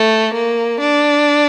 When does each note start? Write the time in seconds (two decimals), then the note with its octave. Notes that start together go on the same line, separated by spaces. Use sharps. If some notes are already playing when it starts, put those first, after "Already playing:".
Already playing: A3
0.34 A#3
0.80 D4